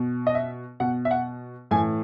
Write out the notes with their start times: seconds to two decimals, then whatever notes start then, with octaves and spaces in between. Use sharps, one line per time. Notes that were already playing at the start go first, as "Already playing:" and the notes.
Already playing: B2
0.27 D#5
0.35 E5
0.80 B2 F#5
1.05 E5
1.11 F#5
1.71 A2 G#5
1.74 E3